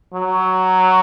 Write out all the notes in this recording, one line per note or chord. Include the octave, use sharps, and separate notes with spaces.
F#3